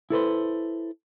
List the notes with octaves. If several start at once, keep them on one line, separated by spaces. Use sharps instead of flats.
E4 A4 B4 C5